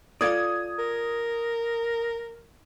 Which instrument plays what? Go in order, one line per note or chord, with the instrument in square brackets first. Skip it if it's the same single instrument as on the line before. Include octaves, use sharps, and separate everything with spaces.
[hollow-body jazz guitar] F4 A4 D5 [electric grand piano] D#6 G#6
[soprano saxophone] A#4